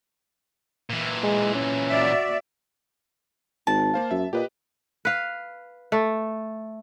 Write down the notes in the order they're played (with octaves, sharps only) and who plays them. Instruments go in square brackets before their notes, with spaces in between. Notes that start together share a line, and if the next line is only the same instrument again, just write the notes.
[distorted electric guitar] A#2 E3
[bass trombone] G#3
C#4
[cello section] F#4 D5 E5
[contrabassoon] G#1 [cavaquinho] A5
[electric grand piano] A#3 C5 F5
[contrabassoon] F#2 [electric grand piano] E5
[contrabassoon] A#2 [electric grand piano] G4 B4 D#5
[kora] B4 F5
A3